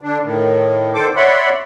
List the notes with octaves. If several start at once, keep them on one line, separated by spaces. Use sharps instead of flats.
D3 D4
A2 D#3
D3 D#3 A4 C5 D6
C#5 D5 E5 F#5 B5 C6